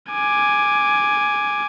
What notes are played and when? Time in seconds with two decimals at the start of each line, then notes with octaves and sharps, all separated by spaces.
0.11 G#5 D6